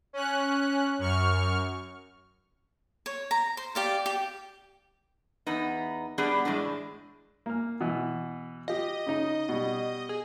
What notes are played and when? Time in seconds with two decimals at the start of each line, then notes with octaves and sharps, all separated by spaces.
0.13 C#4 F#6
0.99 F#2 C#6 F6
3.06 C#5
3.31 A#5
3.57 C5
3.75 G4 D5 F5
4.06 G4
5.47 E2 B3 D#4
6.18 G3 B3 D4 G4 G#4
6.45 A2 E3 G#3 D4
7.46 A#3 F6
7.81 B2 E3
8.68 F4 G4 D#5
9.06 C#3 D#4
9.49 B2 G3
10.09 G#4